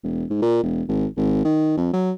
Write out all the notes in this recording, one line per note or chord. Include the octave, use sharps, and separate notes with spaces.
E1
G#2
A#2
E1
G#1
G#1
D#3
F2
F#3